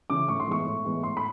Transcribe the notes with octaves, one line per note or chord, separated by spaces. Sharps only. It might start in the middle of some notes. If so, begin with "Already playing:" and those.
C#3 E3 D6
A2 C#6
C6
E3 G#3 B3 C#6
A2
E3 G#3 B3
A2 C6
B5